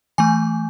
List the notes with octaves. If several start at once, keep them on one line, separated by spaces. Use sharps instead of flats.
E3 A3 G#5